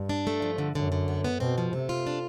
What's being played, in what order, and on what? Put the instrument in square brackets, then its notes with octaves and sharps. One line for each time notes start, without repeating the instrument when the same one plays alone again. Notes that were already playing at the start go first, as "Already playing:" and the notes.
Already playing: [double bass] G2
[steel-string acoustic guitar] D4
A3
F3
D3
[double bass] F#2 [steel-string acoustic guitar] D3
[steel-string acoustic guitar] D3
B3
B3
[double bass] B2 [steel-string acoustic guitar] C4
[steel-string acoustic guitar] F3
[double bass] C3 [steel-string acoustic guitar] A3
[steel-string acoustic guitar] F4
D4